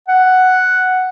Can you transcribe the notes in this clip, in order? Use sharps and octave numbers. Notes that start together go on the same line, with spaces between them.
F#5